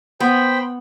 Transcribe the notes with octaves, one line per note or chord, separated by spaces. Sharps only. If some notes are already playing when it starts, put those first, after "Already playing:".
B3 C5 G5 B5